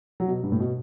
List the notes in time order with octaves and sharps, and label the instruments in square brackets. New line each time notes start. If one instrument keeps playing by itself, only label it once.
[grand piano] F#3
B2
G2
A2
B2